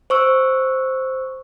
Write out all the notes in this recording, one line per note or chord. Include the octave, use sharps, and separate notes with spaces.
C5 C#6 E6